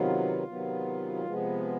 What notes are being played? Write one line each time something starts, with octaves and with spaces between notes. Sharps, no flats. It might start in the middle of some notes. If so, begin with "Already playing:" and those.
Already playing: C3 D#3 F#3 B3 F4
C3 D#3 F#3 B3
C3 F3 G#3 B3